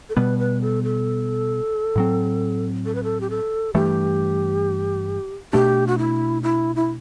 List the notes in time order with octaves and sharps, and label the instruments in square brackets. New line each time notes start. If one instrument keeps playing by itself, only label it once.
[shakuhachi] A4
[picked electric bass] B2 G3 B3 [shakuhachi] B4
[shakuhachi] B4
A4
A4
[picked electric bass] A2 F#3 C4
[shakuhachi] A4
B4
A4
G4
A4
[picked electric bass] G2 E3 A3 [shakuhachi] G4
[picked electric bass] B2 A3 D4 [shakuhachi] G4
[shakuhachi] F#4
E4
E4
E4